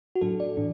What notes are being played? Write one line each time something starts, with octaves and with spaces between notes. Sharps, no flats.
F#4
A2 F#3 D4 A4
D5
A2 E3 D4